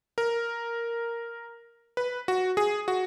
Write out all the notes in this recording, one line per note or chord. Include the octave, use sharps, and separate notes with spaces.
A#4
B4
F#4
G#4
F#4